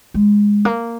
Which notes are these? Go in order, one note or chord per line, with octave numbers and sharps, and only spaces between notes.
G#3
A#3